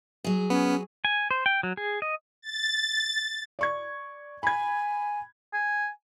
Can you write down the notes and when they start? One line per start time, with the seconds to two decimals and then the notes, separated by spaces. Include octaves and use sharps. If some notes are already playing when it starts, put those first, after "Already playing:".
0.24 F#3 G#4
0.50 B3 C#4
1.05 G#5
1.31 C5
1.46 G5
1.63 F#3
1.77 G#4
2.02 D#5
2.42 A6
3.59 D5 C#6 G#6
4.43 G#5 B5 G#6
5.53 G#5